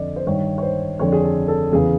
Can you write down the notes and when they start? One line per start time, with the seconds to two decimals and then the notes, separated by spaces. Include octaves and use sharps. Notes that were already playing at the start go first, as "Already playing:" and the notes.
Already playing: F2 D3 D5 D#5
0.16 C5
0.27 G2 D#3 C#5
0.58 C#5
0.62 C5
0.99 F2 D3 C#5
1.12 G#4
1.23 A4
1.48 A4
1.72 E2 C#3 E3 G#4